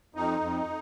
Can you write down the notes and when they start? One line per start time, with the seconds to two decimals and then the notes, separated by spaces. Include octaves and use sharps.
0.15 F2 D#4
0.40 F2